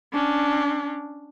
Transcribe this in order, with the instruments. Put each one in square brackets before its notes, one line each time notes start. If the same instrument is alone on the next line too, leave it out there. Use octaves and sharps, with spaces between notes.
[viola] C#4 D4